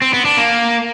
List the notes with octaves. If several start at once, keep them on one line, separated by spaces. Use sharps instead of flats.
C4
B3
D4
A#3